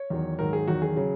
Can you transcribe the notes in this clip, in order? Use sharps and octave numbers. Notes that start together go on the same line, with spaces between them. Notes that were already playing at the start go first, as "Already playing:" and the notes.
Already playing: C#5
E2 D#3 F#3
G#2 D#3 F#3 A#4
G#4
E2 D#3 F#3 F#4
G#4
C#3 F#3